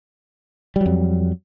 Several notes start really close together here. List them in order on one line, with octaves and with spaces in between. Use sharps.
G3 F#3 F2